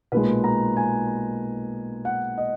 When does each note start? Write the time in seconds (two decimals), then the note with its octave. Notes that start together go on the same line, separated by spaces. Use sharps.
0.12 B1 A#2 G#3 B4
0.44 A#5
0.77 G#5
2.05 F#5
2.38 D#5